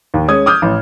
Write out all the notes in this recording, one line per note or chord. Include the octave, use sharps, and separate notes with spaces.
D#2
G#3 C#4 D#6 G#6
D6 D#6 F6 G6
A1